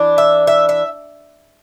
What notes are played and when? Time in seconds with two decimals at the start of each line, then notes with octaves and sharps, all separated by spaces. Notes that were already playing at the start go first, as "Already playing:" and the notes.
Already playing: E3 D4
0.18 E5
0.47 E5
0.69 E5